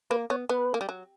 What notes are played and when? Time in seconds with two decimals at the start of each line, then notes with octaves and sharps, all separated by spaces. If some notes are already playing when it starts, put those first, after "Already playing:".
0.10 A#3 B4
0.30 B3 C#5
0.49 B3 B4
0.74 A#3
0.81 G3
0.89 F#3